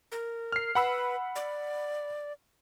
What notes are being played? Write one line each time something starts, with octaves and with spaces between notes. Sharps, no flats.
A#4
F6 C7
B4 F#5 B5 E6
D5